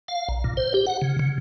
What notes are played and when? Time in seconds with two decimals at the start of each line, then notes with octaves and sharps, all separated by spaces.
0.08 F5
0.29 A#1
0.44 A#2
0.57 C5
0.74 G4
0.87 F#5
1.02 C#3
1.19 C#3